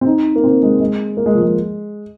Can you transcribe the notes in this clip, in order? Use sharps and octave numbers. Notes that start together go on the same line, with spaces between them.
C4
D#4
A#3
C4
G#3
G#3
A#3
G#3
F3
G#3